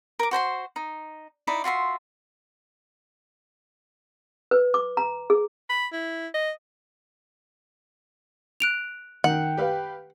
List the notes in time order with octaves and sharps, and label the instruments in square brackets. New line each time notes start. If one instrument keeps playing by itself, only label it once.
[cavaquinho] A#4 D6
F#4 C5 A#5 C6
D#4
D#4 E4 D5
F4 F#4 E5 C6
[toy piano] B4
D6
A#5
G#4
[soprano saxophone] B5
E4
D#5
[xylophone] F#6 D7 F7
[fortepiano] D#3 [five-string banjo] F#5 [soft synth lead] G5
[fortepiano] G4 B4 F5